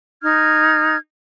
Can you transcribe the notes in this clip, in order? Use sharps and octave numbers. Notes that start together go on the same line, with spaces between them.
D#4 F6 G#6